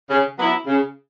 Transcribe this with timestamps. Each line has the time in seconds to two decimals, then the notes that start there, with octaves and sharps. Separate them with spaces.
0.09 C#3
0.38 F#3 B3 E4
0.66 C#3